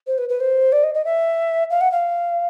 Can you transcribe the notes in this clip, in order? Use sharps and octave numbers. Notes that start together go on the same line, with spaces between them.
C5
B4
B4
C5
D5
D#5
D#5
E5
F5
F#5
F5